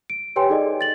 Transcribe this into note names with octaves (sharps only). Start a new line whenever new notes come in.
D7
G4 B4 C#5 G5 G#5 C6
D#4 G#4 A4 D5 D#5
A6 F#7